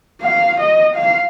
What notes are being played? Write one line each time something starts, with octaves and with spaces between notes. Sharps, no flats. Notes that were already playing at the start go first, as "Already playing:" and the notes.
F5
D#5
F5